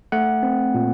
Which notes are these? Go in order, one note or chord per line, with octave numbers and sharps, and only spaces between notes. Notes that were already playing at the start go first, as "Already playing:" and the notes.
A3 F#5
C4
A#2